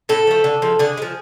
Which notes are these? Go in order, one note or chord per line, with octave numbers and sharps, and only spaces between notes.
A2 A4
F3 A3
D3
F3 G#3
D3 G#4
G#3
F3